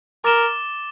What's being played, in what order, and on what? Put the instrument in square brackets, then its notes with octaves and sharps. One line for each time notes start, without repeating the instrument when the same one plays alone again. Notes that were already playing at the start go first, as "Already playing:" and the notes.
[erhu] A#4 [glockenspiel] D6 A6 E7 G7